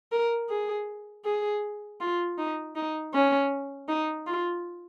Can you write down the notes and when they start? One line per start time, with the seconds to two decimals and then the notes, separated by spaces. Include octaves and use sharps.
0.12 A#4
0.49 G#4
1.24 G#4
2.01 F4
2.38 D#4
2.76 D#4
3.14 C#4
3.89 D#4
4.27 F4